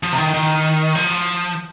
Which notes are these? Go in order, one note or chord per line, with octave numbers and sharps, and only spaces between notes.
F3
C3
D#3
D#3
F3